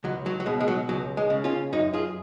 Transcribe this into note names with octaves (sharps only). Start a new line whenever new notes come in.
C#2 F#3
F#3
F#3
B2 G#3
G#3
F#3
C#2 F#3
G#3
C#3
C#4 F4
F#2 D#4 F#4
F4 G#4